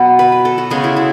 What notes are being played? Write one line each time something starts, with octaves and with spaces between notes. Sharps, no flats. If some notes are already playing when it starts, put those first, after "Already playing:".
Already playing: B2 F#3 B3
B4
B4
A4
F#4
C#3 G#3 B3 G#4
E4
E4